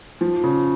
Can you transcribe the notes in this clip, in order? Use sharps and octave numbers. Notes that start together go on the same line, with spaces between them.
F3
C#3